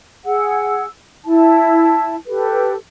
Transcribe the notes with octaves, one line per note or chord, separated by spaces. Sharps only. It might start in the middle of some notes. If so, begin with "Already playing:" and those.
G#4 F#5 E6
E4 A5
G4 A4 B4